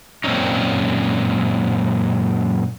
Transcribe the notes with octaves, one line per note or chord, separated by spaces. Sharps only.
F#2 A#2 C4 C#4 D#4